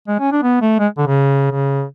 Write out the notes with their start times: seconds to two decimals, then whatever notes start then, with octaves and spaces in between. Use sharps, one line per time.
0.08 G#3
0.20 C#4
0.32 D4
0.43 B3
0.61 A3
0.79 G#3
0.98 D3
1.06 C#3
1.51 C#3